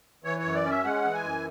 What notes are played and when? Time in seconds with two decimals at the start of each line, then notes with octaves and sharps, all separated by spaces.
0.24 E3 C#5
0.39 C#5
0.45 F#2
0.54 D5
0.64 C#4
0.70 E5
0.84 G#3 F#5
1.04 E3
1.14 G#5
1.24 F#2